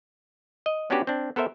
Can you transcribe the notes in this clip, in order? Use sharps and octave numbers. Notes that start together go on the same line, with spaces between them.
D#5
B3 C#4 D4 F#4 G4 B4
C4 D4
B3 A4 A#4 C5 E5